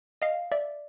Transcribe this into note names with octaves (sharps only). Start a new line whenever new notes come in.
D#5 F5
D5 E5